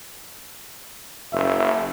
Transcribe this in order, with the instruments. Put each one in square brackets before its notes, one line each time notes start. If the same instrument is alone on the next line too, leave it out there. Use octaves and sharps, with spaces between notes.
[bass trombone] F#1 [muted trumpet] E5